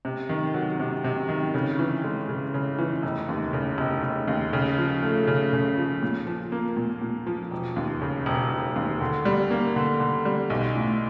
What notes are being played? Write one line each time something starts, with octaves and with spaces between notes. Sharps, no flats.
C3
D#3
F#3
C3
C3
D#3
C#3
E3
G#3
C#3
C#3
E3
F1
D#2
C#3
F1
F1
D#2
C#3
F3
A3
C#3
C#3
F3
A#2
F3
A#3
A#2
A#2
F3
E1
D#2
C#3
E1
E1
D#2
D3
G3
A#3
D3
D3
G3
B1
A2